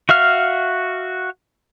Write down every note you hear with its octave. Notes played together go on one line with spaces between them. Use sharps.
F#4 E5 F5 F6